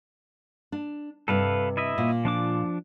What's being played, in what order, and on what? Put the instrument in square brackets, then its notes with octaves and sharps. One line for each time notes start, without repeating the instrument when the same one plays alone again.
[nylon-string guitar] D4
[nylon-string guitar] G2 C3 [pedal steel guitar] A4 B4 F5
[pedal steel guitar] E4 D#5 E5
[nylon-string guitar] A#2
[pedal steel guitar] F3 D4 D6